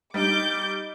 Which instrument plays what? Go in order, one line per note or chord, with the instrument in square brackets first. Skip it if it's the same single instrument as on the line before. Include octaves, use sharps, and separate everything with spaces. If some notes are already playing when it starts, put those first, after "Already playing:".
[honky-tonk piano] G3 D#4 [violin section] D6 G6